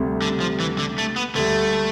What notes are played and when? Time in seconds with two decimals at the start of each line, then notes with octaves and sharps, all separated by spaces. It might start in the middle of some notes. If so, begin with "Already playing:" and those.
Already playing: D2 C3 G3
0.22 D3
0.40 F3
0.60 E3
0.79 D3
0.98 A3
1.16 B3
1.35 D2 D3 G3 A3